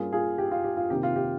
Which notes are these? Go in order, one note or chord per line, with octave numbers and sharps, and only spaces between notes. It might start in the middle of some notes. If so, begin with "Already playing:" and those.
Already playing: G2 G3 A#3 C#4 F4 G#4
F4 G#4
G4
F4
G4
F4
C3 D#3 A#3 G4
F4
G4